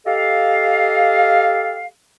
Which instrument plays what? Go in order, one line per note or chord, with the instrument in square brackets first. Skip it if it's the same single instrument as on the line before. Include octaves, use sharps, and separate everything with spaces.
[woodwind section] G4 A4 D#5 F5